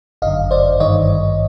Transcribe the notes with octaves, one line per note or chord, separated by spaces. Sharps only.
G1 F#2 D3 D#5 F5
C5 D5
G#1 G2 D#3 C#5 D#5